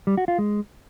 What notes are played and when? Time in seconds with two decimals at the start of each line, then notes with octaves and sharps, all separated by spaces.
0.07 G3
0.18 F#4
0.28 F4
0.38 G#3